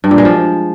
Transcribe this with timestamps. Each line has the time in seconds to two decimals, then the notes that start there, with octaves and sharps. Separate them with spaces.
0.04 G2
0.11 A#2
0.18 G#3
0.25 F3